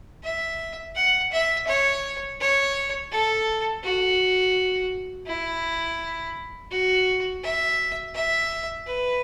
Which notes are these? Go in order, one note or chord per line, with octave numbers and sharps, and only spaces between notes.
E5
F#5
E5
C#5
C#5
A4
F#4
E4
F#4
E5
E5
B4